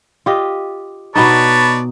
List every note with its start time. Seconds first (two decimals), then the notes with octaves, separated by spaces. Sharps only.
0.26 F4 G4 D#5
1.15 B2 B3 D#4 B4 C#5 D5 A5